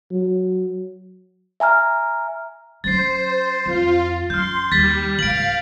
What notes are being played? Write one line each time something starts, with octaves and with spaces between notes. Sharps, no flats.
F#3
E5 G#5 A#5 F6
F#3 C#4 C5 A6 C7
F2 F4
F#2 C6 F6 G6
D#2 G3 A6 B6
C#2 G#2 F5 D7 F#7